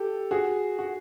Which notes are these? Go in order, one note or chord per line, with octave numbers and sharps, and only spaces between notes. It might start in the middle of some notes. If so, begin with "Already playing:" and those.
Already playing: G4 A4
F#4 G#4
F#4